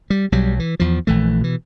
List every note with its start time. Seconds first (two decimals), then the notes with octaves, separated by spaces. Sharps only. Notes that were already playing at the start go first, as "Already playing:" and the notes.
0.10 G3
0.32 B1 F#3 G3
0.59 E3
0.80 E2 F3
1.07 A#1 E3 A3
1.41 B2 E3